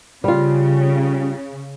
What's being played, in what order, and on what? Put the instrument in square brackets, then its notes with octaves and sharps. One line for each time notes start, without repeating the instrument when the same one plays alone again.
[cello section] C#3 [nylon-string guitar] G3 F4